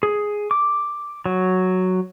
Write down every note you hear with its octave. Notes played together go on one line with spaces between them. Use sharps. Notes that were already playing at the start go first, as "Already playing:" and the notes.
G#4
D6
F#3